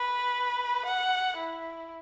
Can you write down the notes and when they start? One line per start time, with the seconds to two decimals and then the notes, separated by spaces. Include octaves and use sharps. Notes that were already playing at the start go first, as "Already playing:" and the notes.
Already playing: B4
0.85 F#5
1.37 E4